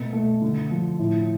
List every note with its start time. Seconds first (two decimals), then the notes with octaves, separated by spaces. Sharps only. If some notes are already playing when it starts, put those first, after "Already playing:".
Already playing: B2 A3
0.13 A3
0.42 D3
0.71 F3
0.99 A2